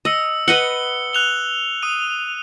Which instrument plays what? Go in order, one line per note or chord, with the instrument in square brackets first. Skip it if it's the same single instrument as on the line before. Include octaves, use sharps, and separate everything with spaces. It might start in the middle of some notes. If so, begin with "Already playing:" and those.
[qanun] D#5 [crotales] D#6 E6 C#7
[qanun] B4 D#5 F#5 [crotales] C#7 G7
[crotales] F#6 F7 G7
D#6 D#7